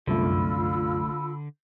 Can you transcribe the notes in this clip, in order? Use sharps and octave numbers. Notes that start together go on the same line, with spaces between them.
C2 F#2 D3 A3 F4 B5 E6